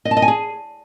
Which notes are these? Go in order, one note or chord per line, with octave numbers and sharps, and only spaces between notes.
D#5
A5
D#5
G#5
G#4